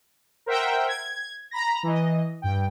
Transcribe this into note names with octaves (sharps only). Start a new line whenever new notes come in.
A#4 C5 E5 F#5 G5
G#6
A#5 B5 A#6
E3 D#5
G2 G5